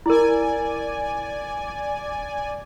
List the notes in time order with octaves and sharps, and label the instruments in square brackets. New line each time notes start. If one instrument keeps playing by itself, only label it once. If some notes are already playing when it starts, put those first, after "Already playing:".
[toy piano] E4 A#4 [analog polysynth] D5 G#5